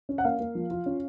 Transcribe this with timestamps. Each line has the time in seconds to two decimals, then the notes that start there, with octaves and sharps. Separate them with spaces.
0.09 C#4
0.18 F#5
0.25 A#3 F5
0.40 A#3
0.55 F3
0.71 F4
0.86 C#4